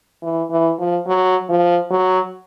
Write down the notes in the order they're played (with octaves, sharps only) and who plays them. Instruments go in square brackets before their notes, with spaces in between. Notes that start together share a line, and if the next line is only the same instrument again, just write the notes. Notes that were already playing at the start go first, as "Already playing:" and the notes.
[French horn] E3
E3
F3
F#3
F3
F#3